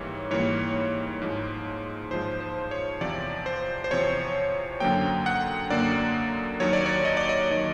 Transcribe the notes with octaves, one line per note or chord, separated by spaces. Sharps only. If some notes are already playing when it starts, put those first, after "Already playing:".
Already playing: G#2 E3 G3 A#3 C#5
G#2 E3 G3 A#3 C#5
G#2 F3 G#3
G#2 F3 G#3 C5
C5
C#5
E2 C3 F3 D5
C5
C5
E2 C3 F3 C#5
F#2 D3 F#3 A#3 G5
F#5
F#2 D3 F#3 A#3 D5
D#2 D#3 F#3 C#5
D5
C#5
D#5
D5
D#5
D#3 F#3